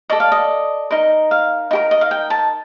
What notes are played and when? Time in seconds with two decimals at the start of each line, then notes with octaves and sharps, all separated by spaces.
0.10 A4 D5 D#5
0.20 F5
0.32 D#5
0.91 D#4 A#4 D#5
1.31 F5
1.71 D#4 G4 A#4
1.91 D#5
2.01 F5
2.11 G5
2.30 A5